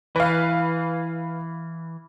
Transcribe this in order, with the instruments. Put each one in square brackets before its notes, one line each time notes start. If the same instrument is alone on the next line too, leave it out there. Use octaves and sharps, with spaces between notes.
[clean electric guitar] E3 [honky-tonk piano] B4 F5